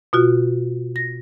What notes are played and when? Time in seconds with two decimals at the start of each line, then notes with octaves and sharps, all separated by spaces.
0.13 B2 F4 F#4
0.96 A#6